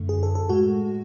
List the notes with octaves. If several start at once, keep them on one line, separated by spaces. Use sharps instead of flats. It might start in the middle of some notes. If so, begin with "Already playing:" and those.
Already playing: F#2 D3 A3
G#4
A4
A4
A2 G#3 F#4